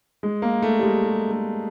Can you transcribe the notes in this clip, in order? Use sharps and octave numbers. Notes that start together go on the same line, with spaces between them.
G#3
A#3
A3
G3
G#3
G3
A3